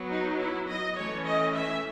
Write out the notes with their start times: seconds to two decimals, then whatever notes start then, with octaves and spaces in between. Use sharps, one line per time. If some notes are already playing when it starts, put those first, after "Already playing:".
Already playing: F#3 B3
0.09 D#4
0.38 E4
0.67 D#5
0.96 E3 A3 C#4 C#5
1.24 D#5
1.54 E5